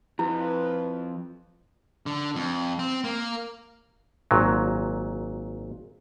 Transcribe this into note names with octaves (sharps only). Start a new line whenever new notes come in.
F2 F3 E4 F4 B4
D3
F2
C4
A#3
G#1 A#2 F#3